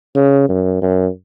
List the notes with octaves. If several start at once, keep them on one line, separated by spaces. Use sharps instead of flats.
C#3
F#2
F#2